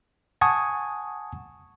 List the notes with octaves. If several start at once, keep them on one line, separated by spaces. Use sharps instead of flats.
F#5 G#5 A5 C#6 D#6 G#6